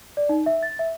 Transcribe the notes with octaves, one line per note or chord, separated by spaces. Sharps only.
D5
D#4
E5
A6
E5